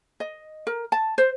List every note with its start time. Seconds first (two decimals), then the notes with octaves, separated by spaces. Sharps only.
0.20 D#5
0.67 A#4
0.92 A5
1.18 C5